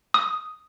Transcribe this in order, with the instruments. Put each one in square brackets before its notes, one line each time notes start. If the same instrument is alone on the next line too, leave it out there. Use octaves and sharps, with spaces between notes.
[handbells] D#6